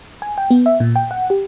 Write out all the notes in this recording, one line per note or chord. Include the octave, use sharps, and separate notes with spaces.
G#5
G5
B3
E5
A#2
G5
F#5
G4